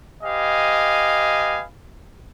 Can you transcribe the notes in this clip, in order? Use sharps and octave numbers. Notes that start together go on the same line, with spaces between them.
G4 B4 D#5 F5 G#5